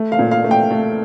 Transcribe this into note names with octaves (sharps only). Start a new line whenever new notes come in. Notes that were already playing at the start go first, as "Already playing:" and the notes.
Already playing: A3
F5
A#2
F5
A3
G5
A3